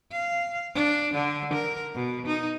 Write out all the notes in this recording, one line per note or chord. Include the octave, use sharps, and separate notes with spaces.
F5
D4
D3
A#4
B2
D#4